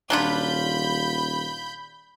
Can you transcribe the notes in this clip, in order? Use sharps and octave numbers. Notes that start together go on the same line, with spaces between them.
D#1 F#3 D4 F4 B5 G6